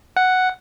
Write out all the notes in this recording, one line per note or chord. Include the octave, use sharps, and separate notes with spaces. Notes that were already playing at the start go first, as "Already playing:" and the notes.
F#5